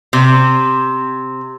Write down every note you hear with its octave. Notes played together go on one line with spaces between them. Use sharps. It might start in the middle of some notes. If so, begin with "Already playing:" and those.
C3